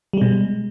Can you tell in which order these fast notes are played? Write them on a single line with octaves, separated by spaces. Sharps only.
G3 G#3 B2